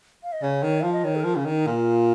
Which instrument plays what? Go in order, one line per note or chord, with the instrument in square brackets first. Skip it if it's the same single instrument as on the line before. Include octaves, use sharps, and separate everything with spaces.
[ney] F5
D#5
[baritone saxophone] C#3 [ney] C#5
[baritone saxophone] D#3
[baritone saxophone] F3 [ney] F5
[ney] D#5
[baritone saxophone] D#3 [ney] C#5
[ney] G#4
[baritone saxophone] F3 [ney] A#4
[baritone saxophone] C#3 [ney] C#4
[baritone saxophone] D#3 [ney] D#4
[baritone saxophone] A#2 [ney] F4